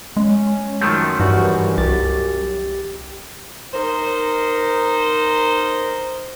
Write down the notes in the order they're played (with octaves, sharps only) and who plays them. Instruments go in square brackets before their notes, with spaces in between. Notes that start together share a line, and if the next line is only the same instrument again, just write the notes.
[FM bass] G#3 [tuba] C#4
[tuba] F#2 [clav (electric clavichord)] D#3 F3 A3
[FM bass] G2 [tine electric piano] E3 G3 F#4
[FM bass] C2 [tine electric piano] G4 A6
[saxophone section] D#4 A#4 C5